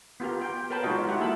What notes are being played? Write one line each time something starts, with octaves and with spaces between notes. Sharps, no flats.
B3 F4 G4 A#4
G5
A#4 B4 C#5 G5 A5 B5
G#3 D#4 F4 F#4 D#5 F5
G#3 E4 G4 F#5
A#3 F4 E5 A5 B5